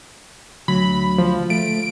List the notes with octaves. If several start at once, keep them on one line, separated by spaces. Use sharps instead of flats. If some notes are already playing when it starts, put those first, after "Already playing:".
D2 F#3 B5
F3
A3 D7